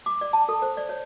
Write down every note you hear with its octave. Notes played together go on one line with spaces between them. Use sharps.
D6
D5
A5
A4
C5
D5
C#5